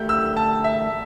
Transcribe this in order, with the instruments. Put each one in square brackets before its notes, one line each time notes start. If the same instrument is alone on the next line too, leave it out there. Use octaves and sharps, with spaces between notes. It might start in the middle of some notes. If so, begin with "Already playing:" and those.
Already playing: [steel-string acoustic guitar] D3 A3 G4 [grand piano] G6
[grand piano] E6
A5
E5